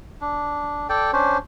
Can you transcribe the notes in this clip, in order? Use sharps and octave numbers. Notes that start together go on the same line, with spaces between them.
D4
A4 D5 G5
C#4 D4 C5